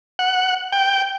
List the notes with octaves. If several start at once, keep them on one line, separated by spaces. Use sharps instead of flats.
F#5
G5